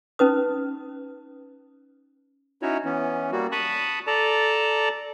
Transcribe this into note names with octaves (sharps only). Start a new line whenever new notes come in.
C#4 D#4 B4 D#6
C#4 D#4 E4 F#4 C#5
E3 B3 C#4
G3 A#3 F#4
A5 B5 C#6 D#6 F#6
A4 D5 A5 A#5